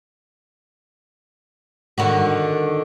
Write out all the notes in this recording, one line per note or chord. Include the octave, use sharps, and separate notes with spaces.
D3 D#3 F#4